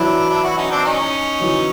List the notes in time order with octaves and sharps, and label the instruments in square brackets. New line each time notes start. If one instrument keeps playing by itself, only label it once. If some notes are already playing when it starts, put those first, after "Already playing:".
Already playing: [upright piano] E3 F#3 [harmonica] D4 E4
[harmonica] D4 E4
E4 F#4
C#4 D#4
C4 D4
C#4 D#4
[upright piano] E3 F#3